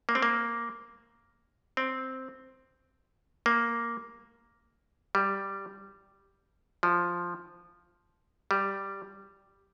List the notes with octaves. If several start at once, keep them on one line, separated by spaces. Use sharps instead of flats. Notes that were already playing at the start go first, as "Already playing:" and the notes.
A#3
C4
A#3
C4
A#3
G3
F3
G3